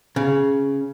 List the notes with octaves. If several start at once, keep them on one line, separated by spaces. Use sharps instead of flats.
C#3